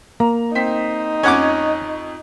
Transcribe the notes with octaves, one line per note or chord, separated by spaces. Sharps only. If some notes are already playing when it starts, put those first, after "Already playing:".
A#3 A#5
C4 D#4 B6
F2 C#4 F#5 C#6 D6 G#6